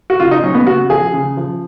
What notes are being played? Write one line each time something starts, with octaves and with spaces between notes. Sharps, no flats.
F#4
C#3 F4
D#4
F#3 C#4
B3
C#3 F#4
F3 G#4
C#3
F3